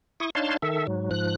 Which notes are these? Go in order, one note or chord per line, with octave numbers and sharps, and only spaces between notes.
E4 C#6 D#6
D4 D#4 C#5 F5 A5 C6
D#3 A4 E5
G#2 F#3
G#2 F3 F#6